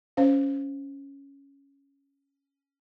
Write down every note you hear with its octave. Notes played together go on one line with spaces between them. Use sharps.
C#4 C5 F5